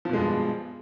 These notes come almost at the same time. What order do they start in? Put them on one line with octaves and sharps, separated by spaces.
F3 B2 G#3 G2